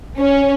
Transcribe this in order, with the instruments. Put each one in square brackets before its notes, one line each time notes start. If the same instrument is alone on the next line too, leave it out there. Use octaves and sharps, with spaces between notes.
[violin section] C#4